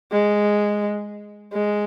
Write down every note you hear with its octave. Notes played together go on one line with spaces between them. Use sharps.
G#3
G#3